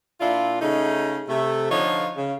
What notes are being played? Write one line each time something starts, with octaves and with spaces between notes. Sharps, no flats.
A#2 D4 E4 F4
C#3 A3 D#4
C3 A3
D3 F3 D#4 F4 C#5
C#3